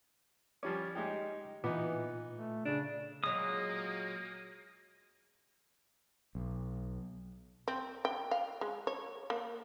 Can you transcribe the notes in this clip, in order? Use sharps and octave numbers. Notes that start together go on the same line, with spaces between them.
F3 G3 C#4 D6
G#3 D#4 G4
A#2 E3 B3 D#4 F4 D6
A3
C#3 D4
A#2 F#3 G#3 A#3 D#6
B1
C4
G5
F5
G#3
C#5
A#3